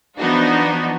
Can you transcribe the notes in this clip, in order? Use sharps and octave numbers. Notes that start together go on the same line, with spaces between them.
E3 F3 B3 D4 D#4 F#4